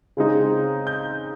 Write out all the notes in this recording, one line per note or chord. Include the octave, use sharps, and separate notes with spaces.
C#3 G#3 C4 D#4
G6